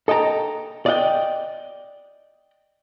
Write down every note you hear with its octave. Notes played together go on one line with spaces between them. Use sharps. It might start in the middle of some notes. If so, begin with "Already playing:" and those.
A4 D#5 G5 A5 A#5
D5 D#5 F5 G5